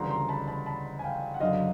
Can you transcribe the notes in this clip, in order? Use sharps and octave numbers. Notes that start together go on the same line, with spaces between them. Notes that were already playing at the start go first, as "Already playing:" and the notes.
Already playing: D2 C#3 E3 G3 A#5 C6
A#5 C6
A5 B5
A5 B5
A5 B5
G#5
F5 G5
F#5
F#1 F#2 D3 F#3 D#5 F5